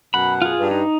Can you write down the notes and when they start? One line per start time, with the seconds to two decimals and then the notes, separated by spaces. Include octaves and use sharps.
0.14 F#2 B2 F#5 B5
0.42 F4 G#4
0.59 G2
0.71 D#4